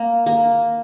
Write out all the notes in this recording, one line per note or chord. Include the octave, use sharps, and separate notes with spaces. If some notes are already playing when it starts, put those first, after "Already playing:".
Already playing: A#3
A#3